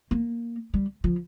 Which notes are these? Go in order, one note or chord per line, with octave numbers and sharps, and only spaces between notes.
A#3
G3
F3